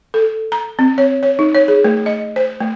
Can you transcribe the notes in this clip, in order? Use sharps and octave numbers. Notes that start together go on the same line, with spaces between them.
A4
A#5
C4
C#5
C#5
D#4
C#5
G#4
A3
D#5
C5
A3